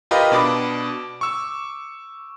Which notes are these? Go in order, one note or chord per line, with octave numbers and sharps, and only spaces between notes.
F4 G4 A#4 B4 D#5
B2 D4 B5 D6
C#6 E6